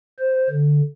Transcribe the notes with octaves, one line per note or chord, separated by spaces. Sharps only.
C5
D3